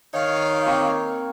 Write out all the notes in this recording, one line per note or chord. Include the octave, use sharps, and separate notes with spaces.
D#3 D#4 C#5 F5
A#3 C4 C#6